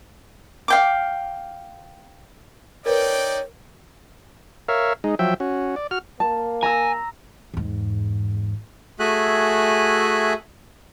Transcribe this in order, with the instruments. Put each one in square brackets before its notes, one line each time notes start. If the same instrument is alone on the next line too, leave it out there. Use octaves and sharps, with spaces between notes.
[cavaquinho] F5 G5 D6
[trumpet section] D#4 D5 G5 [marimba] A#4 B4 [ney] C#5
[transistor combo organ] A#4 C#5 E5 F5
G#3 D#4
F3 F#3 E5 G5
C#4 F#4
D5
F#4 F6
[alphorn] A#3 [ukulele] A5
[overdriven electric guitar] G#5 [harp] A#5 E6
[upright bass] E2 G#2
[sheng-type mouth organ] A3 F#4 G#4 E5 G#5 F#6